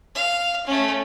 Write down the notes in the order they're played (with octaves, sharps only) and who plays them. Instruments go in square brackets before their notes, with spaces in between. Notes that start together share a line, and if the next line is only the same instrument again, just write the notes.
[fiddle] F5
A3 C#4